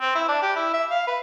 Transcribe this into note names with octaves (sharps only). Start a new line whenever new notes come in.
C4
E4
D4
G4
E4
E5
F5
B4